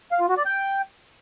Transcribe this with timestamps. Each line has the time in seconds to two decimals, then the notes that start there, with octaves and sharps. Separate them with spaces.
0.12 F5
0.20 F4
0.29 F#4
0.37 D5
0.46 G5